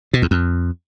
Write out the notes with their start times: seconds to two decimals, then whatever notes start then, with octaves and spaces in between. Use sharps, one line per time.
0.13 B2
0.22 E2
0.31 F2